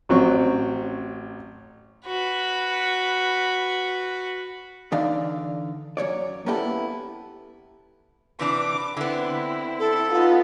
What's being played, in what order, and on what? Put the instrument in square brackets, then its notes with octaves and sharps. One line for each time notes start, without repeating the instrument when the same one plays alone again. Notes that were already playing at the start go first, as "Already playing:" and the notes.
[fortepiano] A1 F#3 C4 C#4 C#6
[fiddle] F#4 B4
[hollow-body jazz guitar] D3 E3 D#4 D5 F5
F#2 B2 C#5 D5
A#3 B3 C#4 E4 G4 A4
[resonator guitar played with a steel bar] C3 E3 D4 [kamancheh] D6
[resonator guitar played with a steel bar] D3 B3 [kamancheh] C4 E4
[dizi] A4
[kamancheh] B3 D#4 [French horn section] F4